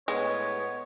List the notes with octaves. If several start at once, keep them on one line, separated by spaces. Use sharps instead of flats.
A2 G#3 B3 C#5